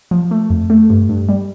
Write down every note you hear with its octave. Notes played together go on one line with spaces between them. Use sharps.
F3
A3
F2
A3
G2
G2
G3